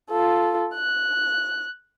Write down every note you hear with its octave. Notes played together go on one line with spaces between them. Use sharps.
F4 A4
F#6